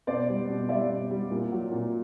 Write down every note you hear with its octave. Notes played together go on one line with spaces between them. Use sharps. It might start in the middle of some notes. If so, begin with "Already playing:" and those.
B2 C5 D5
G3
B2
G3 D5 E5
B2
G3
A#2
F#3
A#2